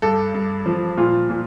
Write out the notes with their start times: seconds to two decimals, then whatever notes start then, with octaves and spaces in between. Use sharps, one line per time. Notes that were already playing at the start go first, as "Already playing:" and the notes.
0.02 G2 A4
0.34 G2
0.66 F3
0.97 A#2 F4
1.30 A#2